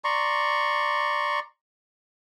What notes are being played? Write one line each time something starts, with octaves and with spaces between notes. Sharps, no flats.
D5 A#5 C6 C#6